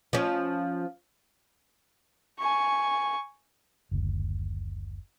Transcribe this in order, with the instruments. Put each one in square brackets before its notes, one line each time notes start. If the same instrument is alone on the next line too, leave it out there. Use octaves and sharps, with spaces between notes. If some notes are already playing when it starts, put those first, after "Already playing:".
[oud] F3 C#4
[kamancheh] G#5 C#6
[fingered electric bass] F#1 D2